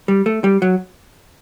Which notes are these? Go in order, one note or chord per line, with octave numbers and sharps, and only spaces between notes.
G3
A3
G3
F#3